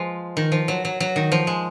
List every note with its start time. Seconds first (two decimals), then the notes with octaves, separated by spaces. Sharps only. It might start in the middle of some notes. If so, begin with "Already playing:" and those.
Already playing: F3 G#3
0.37 D#3
0.52 F3
0.68 F#3
0.85 F#3
1.00 F#3
1.16 D#3
1.32 F3
1.47 G#3